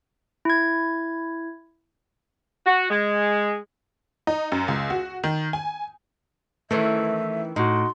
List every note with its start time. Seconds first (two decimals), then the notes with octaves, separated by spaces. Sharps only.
0.45 E4 G#6
2.66 F#4
2.89 G#3
4.27 D#4
4.52 F#2
4.68 C#2
4.90 F#4
5.24 D#3
5.53 G#5
6.71 D#3 E3 A3 C#4 E5
7.56 A2 D#4 F#4 C6